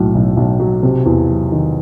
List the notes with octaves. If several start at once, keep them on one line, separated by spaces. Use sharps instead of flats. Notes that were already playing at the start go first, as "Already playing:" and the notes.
Already playing: B1 A2 F#3
B1
B1
F#3
C3
E2
F#3
D#3